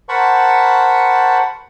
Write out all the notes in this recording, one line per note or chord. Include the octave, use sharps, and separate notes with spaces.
A#4 C5 F#5 A5 B5 C#6